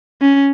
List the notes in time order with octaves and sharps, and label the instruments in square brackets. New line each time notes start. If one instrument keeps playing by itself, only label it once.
[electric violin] C#4